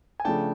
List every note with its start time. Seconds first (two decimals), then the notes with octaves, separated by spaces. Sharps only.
0.20 G#5
0.25 C#3 F3 A3 D4 G5 A5